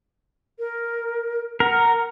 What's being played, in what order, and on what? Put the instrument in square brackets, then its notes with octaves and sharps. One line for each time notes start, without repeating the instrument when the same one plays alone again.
[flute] A#4
[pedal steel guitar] A#4 [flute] F#5